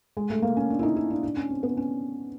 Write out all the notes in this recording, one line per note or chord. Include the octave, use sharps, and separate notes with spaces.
G#3
A3
A#3
C#4
D4
E4
D#4
E4
D4
D4
C#4
C4
B3
C#4